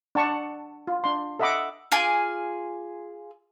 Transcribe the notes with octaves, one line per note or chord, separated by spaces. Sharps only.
D4 F#5 A5 C#6
F4
D4 C6
A4 D#5 E5 F#5 B5 D6
F4 G#4 G#5 D6